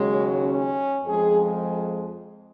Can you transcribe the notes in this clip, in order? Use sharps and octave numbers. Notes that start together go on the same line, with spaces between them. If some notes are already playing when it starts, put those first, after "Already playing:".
Already playing: D#2 C#3 F#3 G#3
C#4
F2 F3 G#3 G#4